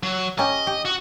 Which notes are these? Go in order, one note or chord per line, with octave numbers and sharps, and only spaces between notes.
F#3
A#3 C#4 G4 D#5
G4
F#4